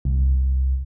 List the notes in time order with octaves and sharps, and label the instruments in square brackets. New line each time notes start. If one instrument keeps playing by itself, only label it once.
[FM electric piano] C2